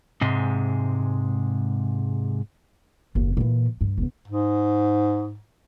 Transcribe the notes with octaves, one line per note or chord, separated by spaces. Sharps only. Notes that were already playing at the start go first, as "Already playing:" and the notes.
G#2 C3 G#3
F#1 D#2
A#2 E3
G2
E1 B2
G#2